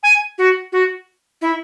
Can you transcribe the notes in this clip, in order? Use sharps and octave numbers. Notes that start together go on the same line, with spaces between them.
G#5
F#4
F#4
E4